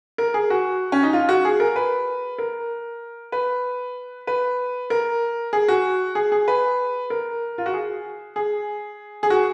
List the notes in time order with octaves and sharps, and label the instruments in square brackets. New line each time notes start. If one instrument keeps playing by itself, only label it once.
[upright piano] A#4
G#4
F#4
C#4
D#4
F4
F#4
G#4
A#4
B4
A#4
B4
B4
A#4
G#4
F#4
G#4
G#4
B4
A#4
F4
F#4
G#4
G#4
G#4
F#4